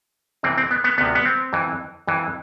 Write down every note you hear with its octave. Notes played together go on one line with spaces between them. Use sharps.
F2 C3 E3 C4
C4
B3
B3
D2 C3 F3 B3
B3
C4
F2 E3
F2 E3